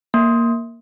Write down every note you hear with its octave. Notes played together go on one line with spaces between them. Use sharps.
A#3